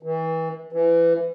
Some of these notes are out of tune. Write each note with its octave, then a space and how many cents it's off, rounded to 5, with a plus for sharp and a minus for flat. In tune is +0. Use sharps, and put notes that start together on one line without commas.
E3 -30
E3 +25